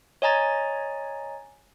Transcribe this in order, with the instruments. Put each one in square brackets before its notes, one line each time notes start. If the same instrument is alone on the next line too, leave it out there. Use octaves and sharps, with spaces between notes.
[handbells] C#5 D#5 G#5 A#5 A6